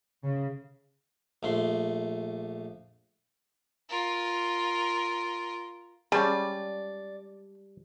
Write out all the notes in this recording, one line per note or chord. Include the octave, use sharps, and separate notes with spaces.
C#3
A#1 A3 C6
F4 A#4
G3 G#3 C#4 D5 A5